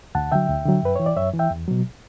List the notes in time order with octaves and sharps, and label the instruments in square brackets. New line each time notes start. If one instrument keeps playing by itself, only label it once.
[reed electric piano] D2 F#5 A5
D3 F#3 E5 G5
D2
D3 F#3
F#2 B4
E3 C#5
D5
F#2 C#5 E5
E3
E5 G5
E2
B2 F#3